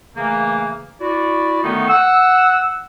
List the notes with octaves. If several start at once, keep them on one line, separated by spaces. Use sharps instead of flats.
C#3 E3 A3 A#3
E4 F#4 D5
D3 D#3 A3 B3 C#4 D#4
F#5 E6